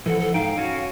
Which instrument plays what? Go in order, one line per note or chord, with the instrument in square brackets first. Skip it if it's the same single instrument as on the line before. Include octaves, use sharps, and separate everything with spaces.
[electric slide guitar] E3 F3 F#5 [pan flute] A4
[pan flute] A4
[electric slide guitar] G#2 D#4 G5 [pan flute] F5
[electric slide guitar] C#4 F#4